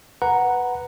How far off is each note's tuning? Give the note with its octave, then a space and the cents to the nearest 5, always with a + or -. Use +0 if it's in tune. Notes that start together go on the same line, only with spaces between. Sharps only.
B4 +0 F#5 +0 A#5 +0